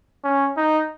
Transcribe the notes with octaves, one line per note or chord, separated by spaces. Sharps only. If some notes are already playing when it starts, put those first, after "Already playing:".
C#4
D#4